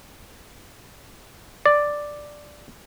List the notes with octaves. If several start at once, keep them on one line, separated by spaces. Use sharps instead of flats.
D5